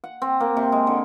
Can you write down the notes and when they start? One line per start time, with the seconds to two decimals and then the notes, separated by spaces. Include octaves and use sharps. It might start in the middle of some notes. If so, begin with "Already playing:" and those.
0.04 F#5
0.22 C4
0.40 A#3
0.57 C3
0.72 G#3
0.87 D3